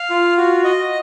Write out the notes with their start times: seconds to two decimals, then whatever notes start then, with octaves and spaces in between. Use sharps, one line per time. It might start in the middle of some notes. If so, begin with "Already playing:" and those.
Already playing: F5
0.10 F4
0.37 F#4
0.64 D#5